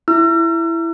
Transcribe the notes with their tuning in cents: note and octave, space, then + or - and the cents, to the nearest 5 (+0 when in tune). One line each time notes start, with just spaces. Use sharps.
E4 +10 E6 +45